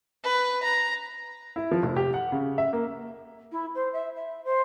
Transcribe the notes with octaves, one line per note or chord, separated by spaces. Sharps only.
B4
A#5
E4
F3
F1
G4
F#5
C#3
E5
A#3
E4
C5
E5
E5
C5